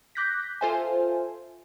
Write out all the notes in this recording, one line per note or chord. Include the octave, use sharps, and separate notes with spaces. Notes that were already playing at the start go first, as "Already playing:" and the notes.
D6 F#6 G6 A#6 B6
F4 A4 C5 E5 G#5